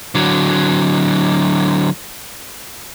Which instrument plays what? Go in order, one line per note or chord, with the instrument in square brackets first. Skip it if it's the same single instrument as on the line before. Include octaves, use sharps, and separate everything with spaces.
[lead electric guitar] D3 F#3